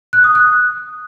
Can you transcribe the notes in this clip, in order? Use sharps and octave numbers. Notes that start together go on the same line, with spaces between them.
F#6
D#6
F#6